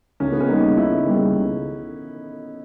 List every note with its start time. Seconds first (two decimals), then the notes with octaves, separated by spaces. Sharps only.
0.20 C#2 C#4
0.32 B3
0.40 C#4
0.48 C#3 G3 A#3 D#4
0.77 C#2 E4
1.06 C#3 G3 A#3
1.35 C#2